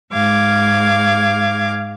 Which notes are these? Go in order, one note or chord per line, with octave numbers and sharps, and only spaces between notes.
G#2 F5 D6 G#6